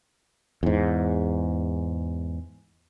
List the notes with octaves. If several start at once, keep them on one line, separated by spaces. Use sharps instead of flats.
E2 G#2